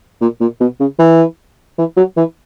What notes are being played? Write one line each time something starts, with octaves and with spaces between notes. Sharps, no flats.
A#2
A#2
B2
C#3
E3
E3
F#3
E3